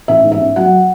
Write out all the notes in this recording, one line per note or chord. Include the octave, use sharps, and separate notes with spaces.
A1 E5
G#2
E5
C#4
F#3 F#5